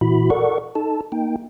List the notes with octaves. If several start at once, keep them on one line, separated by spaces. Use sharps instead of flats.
A#2 E3 E4 F#4 B5
A4 A#4 D5 F#5 C#6
D#4 A4 A5
A#3 D#4 G5